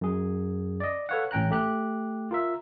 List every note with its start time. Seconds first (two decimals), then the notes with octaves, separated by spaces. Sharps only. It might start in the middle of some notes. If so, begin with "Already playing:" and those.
0.01 F#2 G#4
0.80 D5 D#5
1.09 A4 B4 C#5 F5 F#5
1.31 A1 C#4 G5 A#5 F#6
1.51 A3 G4 F#6
2.31 F4 A#4 E5